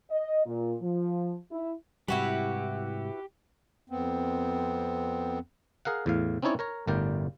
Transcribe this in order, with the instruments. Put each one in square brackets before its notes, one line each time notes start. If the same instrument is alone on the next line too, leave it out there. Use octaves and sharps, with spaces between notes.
[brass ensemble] D#5
A#2
F3
E4
[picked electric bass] G#2 C3 G3 [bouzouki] E4 F#4 B4 [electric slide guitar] G4
[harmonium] F2 B3 C4
[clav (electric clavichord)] G#4 A#4 F5 F#5
E2 A2 F5
C4 C#4 D#4 E4 C#5 D5
A#4 C#5 A#5
G1 A2 G3 A#4 D5 G5